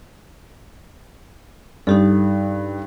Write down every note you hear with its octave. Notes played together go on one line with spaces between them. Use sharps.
G2 D#4 G4 A4